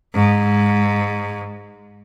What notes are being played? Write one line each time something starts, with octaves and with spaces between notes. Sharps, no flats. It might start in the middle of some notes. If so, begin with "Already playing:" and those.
G#2